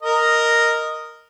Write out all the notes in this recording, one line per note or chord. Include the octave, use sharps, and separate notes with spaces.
A#4 D#5